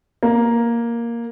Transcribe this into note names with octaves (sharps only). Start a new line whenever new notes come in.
A#3